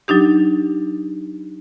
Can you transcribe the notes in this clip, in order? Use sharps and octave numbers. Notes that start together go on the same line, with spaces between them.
F#3 D4 D#4 G4